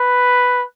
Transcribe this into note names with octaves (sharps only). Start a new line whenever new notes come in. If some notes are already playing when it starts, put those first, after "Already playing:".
Already playing: B4